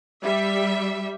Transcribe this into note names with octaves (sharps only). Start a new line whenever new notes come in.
G3 E5